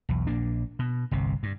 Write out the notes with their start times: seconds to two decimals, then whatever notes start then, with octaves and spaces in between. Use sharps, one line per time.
0.09 B1 E2
0.27 A#1 A#3 D4
0.79 B2
1.11 G1 C2 C3
1.43 G2